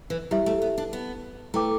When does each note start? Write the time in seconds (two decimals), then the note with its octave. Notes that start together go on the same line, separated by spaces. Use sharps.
0.10 E3
0.31 G3 E4 G4 E5
0.46 A3
0.62 B3
0.78 D4
0.93 B3
1.54 A3 E4 B4 G5 D6